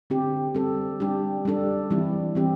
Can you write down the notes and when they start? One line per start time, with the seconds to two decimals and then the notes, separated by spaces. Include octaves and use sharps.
0.10 D3 C4 G4
0.55 G3 C4 A4
1.00 G3 D4 G4
1.45 G3 D4 A4
1.90 E3 G3 C4 E4
2.35 E3 C4 G4